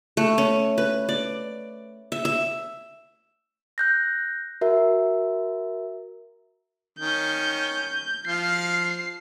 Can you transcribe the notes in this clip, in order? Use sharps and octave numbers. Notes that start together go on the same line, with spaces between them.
A3
C#4
B4
D5
E5
E5
F#6 G6 A#6
F#4 A#4 E5
D#3 C#4 G6
F3 F5 C7